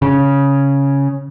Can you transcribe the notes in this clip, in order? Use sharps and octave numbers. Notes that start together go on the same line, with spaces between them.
C#3